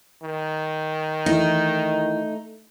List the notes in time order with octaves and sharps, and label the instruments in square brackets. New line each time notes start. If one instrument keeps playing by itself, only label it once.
[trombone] D#3
[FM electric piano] E3 E4 [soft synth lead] A3 [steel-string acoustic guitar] D#4